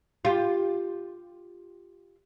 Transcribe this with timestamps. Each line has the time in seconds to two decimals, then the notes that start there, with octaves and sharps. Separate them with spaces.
0.25 F4 G4